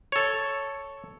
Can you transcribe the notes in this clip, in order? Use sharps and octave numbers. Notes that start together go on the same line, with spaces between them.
A4 C#5